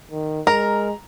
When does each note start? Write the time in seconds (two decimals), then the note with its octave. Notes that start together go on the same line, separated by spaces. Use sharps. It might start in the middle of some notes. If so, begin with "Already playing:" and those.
0.11 D#3
0.47 G#3 A#4 A#5